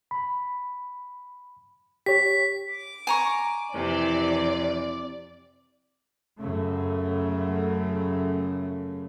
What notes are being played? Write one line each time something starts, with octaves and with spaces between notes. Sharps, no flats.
B5
G4 C#5 B6
D6
G#5 A#5 C#6
F2 C3 E3 D5
F#2 C#3 A3